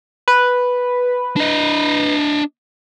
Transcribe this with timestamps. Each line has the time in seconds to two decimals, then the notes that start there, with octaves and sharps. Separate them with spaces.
0.28 B4
1.36 D4 D#5